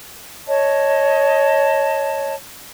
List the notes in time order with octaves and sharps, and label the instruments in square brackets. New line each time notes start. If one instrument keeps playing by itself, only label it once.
[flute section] C#5 D#5 A5